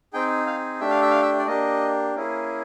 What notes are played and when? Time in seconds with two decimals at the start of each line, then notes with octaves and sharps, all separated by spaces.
0.13 C4 D#4 G#4 G5
0.46 F5
0.80 A3 D4 G4 E5
0.91 F5
1.02 E5
1.11 F5
1.22 E5
1.39 D5
1.47 A#3 D4 G4 D#5
2.15 A#3 C#4 E4 G#4